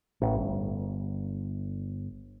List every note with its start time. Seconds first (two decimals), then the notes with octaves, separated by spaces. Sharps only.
0.21 A1
0.35 G1